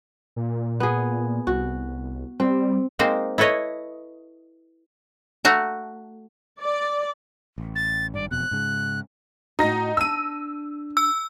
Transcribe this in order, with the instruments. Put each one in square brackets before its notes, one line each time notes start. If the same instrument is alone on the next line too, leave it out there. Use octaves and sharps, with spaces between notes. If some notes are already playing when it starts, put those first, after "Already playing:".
[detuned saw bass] A#2
[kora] B3 G#4
[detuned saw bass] C2 [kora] F#4
[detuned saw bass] G3 [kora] C4
[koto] G#3 A#3 C4 D#4 C5
E4 A4 B4 C#5 D#5
A3 F#4 A#5
[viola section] D5
[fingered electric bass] A1
[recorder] A6
[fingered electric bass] G#1 G2 [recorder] D5
[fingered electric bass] E1 F2 B2 [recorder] F#6
[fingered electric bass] G#2 C#3 G#3
[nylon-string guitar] A2 F#4 [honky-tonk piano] D#4 A#6
[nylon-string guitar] D4 A5 [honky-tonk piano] E6 D#7
[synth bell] E6